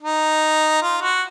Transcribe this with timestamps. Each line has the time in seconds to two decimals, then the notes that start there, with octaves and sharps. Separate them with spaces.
0.02 D#4
0.82 F4
1.02 F#4